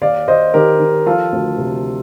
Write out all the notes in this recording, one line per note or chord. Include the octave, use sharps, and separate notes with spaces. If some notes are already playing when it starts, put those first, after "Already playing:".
D#2 D5 F5
D#2 C5 D#5
D#3 G4 A#4
D#3
F3 F4 A4
D2
C3